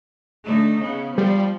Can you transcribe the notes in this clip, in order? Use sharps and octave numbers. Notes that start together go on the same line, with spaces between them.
D3 A3 D#4
C#3 B3
F3 G3